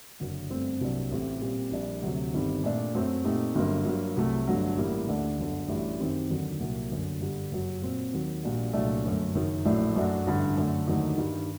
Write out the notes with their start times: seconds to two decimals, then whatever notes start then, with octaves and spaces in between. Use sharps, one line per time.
0.20 F#1 F#2 D3 F#3
0.50 G1 G2 D3 A3 C4
0.81 C2 C3 F#3 A#3 D4
1.11 A1 A2 A3 C4 G4
1.41 A#2 G3 C4 G4
1.71 A#1 A#2 G3 D4
2.02 D2 C3 F#3
2.34 G1 G2 D#3 G3 C4
2.64 A#2 A3 D4
2.94 F#2 F#3 A3 C4
3.24 A#2 A3 C4 D#4 G4
3.55 G1 G2 F#3 A#3
3.85 G2 F#3 A#3
4.16 C2 C3 F#3 A3
4.47 G1 G2 D3 F#3 A3
4.77 A1 A2 G3 A#3
5.07 D2 D3 A3 D4
5.38 G1 F#2 D3
5.68 A1 A2 G3 D4 F#4
5.99 F#2 D#3 F#3 C4 G4
6.30 D#2 D3 F#3
6.60 C2 A#2 F#3 A#3 F#4
6.91 G1 F#2 D3
7.21 G1 G2 D3 G3
7.51 F#1 F#2 F#3
7.82 A#2 F#3 C4
8.13 D#2 D#3 F#3
8.43 A#1 A#2 G3 D4 F#4
8.73 C2 A#2 F#3 A3 D4
9.04 G1 F#2 F#3 A3
9.34 F#1 F#2 D#3 F#3
9.65 A#1 A2 F#3 A3 D4
9.95 F#2 F#3 A3 D4 F#4
10.26 A1 G2 D3
10.56 F#2 D3 A3
10.87 D#2 D3 F#3 A3 D#4
11.17 G2 D#3 G3